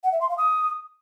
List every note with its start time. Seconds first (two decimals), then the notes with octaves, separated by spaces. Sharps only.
0.04 F#5
0.12 E5
0.21 C6
0.29 F5
0.38 D#6